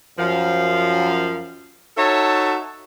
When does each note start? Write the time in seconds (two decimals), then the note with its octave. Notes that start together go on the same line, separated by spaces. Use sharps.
0.18 F#2 F3 F5
1.97 D#4 F#4 A4 C#5 E5 A5